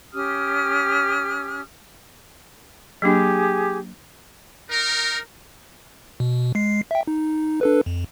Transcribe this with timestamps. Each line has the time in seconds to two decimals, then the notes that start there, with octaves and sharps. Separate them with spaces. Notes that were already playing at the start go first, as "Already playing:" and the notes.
0.13 C#4 G4 D#6 F6
3.02 F#3 A#3 D4 G4 G#4 D6
4.70 D#4 A#4
6.20 B2
6.55 G#3 C7
6.91 E5 G5
7.07 D#4
7.61 D4 A4 B4
7.86 F2